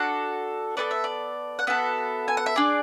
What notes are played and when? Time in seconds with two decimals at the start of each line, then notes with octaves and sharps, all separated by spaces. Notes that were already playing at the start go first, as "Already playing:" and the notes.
Already playing: D4 F#4 A4
0.77 B3 F#4 A4 D5
0.91 E5
1.04 D5
1.59 F#5
1.67 B3 F#4 A4 E5
2.28 G#5
2.37 F#5
2.46 E5
2.56 D4 G#4 D5